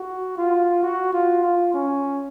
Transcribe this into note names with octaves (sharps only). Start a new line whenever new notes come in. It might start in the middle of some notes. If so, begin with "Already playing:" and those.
Already playing: F#4
F4
F#4
F4
F4
C#4